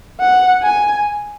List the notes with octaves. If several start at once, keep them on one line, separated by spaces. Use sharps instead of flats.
F#5
G#5